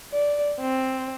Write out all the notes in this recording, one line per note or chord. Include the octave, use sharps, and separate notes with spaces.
D5
C4